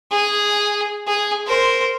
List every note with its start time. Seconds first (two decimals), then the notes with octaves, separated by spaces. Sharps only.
0.11 G#4
1.07 G#4
1.46 A#4 C5